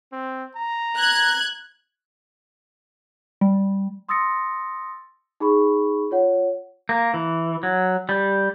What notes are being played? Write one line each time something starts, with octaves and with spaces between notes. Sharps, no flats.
C4
A#5
F#6 G#6
G3
C6 D#6 E6 A6 A#6 C#7
D#4 G#4 B5 C#6
F4 C#5 F#5
A#3
E3
F#3
G3